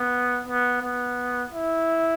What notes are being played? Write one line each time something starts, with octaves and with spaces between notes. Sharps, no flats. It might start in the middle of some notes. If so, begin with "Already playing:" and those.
Already playing: B3
B3
B3
E4